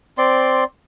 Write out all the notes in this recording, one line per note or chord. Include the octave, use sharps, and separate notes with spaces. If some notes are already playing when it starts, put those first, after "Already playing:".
C4 D5 C6